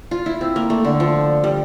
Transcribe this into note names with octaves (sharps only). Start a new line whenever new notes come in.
F4
E4
C4
A#3
A3
D3
F3
G3